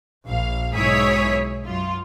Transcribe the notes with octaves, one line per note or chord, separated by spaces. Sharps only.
A#1 F5
B1 G#2 E4 G#4 C#5 B6
F#2 F4